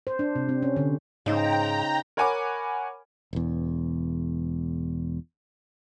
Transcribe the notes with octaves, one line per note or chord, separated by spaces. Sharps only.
C5
D4
C3
C4
C#4
D3
G#2 C#3 D#4 C5 G5 A#5
A#4 C#5 F#5 G#5 B5 D6
E1 E2